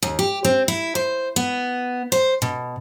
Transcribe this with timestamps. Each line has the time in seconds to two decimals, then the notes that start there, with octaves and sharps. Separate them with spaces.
0.02 D#2
0.19 G4
0.45 C4
0.68 E4
0.95 C5
1.36 B3
2.12 C5
2.42 B2